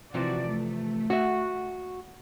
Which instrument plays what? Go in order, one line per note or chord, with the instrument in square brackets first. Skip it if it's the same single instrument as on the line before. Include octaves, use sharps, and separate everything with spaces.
[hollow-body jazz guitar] C3 E3 F3 [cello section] F#4 D5
[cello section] A3
[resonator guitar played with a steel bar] F#4 [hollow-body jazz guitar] C#5 E5